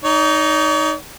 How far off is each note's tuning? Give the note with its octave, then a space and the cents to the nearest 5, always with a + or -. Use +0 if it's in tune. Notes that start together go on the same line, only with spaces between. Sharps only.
D#4 +0 C#5 +45